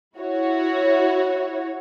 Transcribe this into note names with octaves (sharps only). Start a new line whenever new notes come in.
E4 F#4 C#5